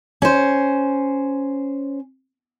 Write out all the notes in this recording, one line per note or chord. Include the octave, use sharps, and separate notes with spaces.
C#4 C5